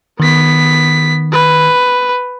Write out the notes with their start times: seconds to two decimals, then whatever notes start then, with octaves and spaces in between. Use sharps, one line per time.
0.20 D#3 B3 B6
1.33 B4